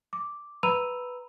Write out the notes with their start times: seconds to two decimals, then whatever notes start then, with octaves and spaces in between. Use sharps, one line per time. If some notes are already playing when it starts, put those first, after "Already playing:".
0.13 D6
0.63 B4 A#5 B5 E6 D#7 F7